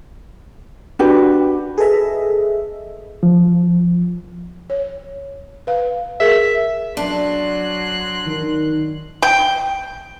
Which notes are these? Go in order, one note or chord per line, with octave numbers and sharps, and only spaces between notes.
D4 F#4 G4 B4
G#4 A4 B4 D#5 E5
F3
C#5
B4 F5
G#4 A#4 E5
F#3 D4 C6 F#6
D#3
G5